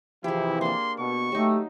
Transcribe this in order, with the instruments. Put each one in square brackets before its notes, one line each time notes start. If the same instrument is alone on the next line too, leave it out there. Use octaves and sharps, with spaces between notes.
[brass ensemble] C3 E3 F3 [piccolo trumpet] E4 [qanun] G4 G#4
[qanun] A#3 D4 [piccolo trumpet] C6
[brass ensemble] B2 [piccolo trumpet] C#6
[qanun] F#3 D#4 [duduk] A3 [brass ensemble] G4